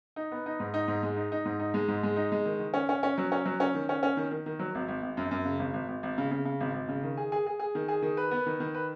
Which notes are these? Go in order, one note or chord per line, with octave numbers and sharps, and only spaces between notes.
D#4
B3
D#4
G#2
D#4
G#2
G#3
D#4
D#4
G#2
D#4
G#3
G#2
G#3
D#4
G#3
D#3
D#3
C#4
C#4
C#4
F#3
C#4
F#3
C#4
D#3
C#4
C#4
D#3
D#3
D#3
F#3
G#1
G#1
G#1
F#2
F#2
C#3
G#1
G#1
G#1
G#1
C#3
C#3
C#3
G#1
G#1
C#3
D#3
G#4
G#4
G#4
G#4
D#3
G#4
D#3
B4
B3
D#3
D#3
B4